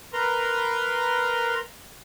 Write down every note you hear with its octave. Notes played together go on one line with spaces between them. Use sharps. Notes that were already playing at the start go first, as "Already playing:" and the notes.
A#4 B4 A#5 C6